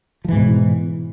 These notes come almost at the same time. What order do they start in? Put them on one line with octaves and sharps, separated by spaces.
F3 E3 G#2 B2